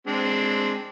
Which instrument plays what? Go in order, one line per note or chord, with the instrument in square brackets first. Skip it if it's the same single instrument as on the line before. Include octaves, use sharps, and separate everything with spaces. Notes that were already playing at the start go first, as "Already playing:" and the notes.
[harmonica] G#3 C4 D4